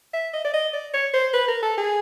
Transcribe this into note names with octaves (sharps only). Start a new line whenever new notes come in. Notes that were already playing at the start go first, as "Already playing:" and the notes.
E5
D#5
D5
D#5
D5
C#5
C5
B4
A#4
A4
G#4